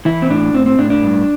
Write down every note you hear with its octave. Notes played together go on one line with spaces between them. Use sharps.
E3 E4
C4
A2 D4
A2 C4
C4
A2 D4
D4
G2